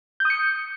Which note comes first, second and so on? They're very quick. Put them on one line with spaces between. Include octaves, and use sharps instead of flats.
G6 D#6 C#7